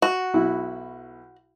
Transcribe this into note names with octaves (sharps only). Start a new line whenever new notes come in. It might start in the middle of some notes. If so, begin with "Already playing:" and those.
F#4
B1 E4